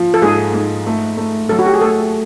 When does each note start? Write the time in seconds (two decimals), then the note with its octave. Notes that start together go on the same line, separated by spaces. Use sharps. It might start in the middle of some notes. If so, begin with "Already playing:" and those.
Already playing: F3
0.14 A4
0.22 G#2 G#4
0.54 G#2
0.86 A3
1.17 A3
1.49 F#3 A4
1.59 F#4
1.66 G4
1.74 G#4
1.81 A3 A4